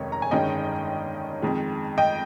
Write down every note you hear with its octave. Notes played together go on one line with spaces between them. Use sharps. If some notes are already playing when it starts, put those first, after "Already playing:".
Already playing: F1 D#2 D#3 G#3 C#4 C#5
A#5
G#5
G1 G2 D#3 G#3 C#4 D#5 G5
F2 D#3 G#3
D#5 G5